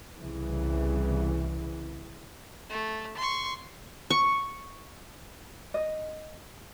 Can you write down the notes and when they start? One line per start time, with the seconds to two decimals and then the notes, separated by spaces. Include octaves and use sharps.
0.18 C2 C#3 E3
2.70 A3
3.17 C6 C#6
4.10 C#6
5.74 D#5